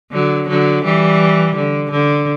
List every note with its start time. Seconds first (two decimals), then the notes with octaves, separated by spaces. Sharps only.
0.12 D3 F#3
0.48 D3 F#3
0.84 E3 G3
1.55 D3
1.91 D3